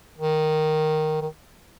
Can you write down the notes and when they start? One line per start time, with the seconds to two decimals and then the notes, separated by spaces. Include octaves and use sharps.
0.18 D#3
1.22 D#3